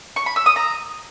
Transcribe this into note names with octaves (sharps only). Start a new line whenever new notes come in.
C#6
B5
E6
D#6
A#5